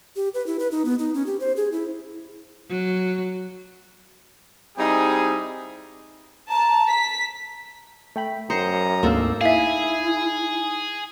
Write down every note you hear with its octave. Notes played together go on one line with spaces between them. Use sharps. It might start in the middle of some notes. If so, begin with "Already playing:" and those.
G4
B4
E4
B4
D#4
B3
D#4
C#4
G4
C5
G#4
E4
F#3
G3 C4 D#4 E4 G#4
A5 A#5
B6
A3 G5 B5
F#2 C5 A#5 D#6 C#7
D2 G#2 A#3 C4 A4 F5
D#4 E4 G#4 E5 F5 G#5